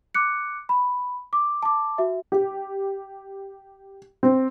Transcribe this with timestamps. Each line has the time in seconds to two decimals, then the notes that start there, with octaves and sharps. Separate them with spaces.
0.15 D6 F#6 C#7
0.69 B5
1.33 D6
1.63 A5 D6
1.98 F#4 E5
2.32 G4
4.23 C4